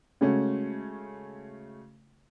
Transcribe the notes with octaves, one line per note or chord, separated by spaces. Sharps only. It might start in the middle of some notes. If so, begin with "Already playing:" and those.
C#3 G#3 A3 C#4 F#4